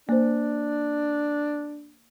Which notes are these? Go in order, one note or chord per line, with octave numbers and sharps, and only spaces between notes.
A#3 D4 C5